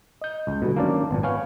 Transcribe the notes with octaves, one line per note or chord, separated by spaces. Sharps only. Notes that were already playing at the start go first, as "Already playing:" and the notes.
D#5 G6
C#2
B2 D3 G3 A3
D#3 F#3 A#3 C#4 D4 D5
G#1 A#2 B3
B3 C#5 F5 G#5